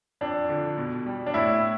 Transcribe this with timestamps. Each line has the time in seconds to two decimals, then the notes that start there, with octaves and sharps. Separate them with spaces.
0.21 F2 D4
0.49 D3 F3
0.78 B2
1.06 G3
1.27 D4
1.34 A2 E4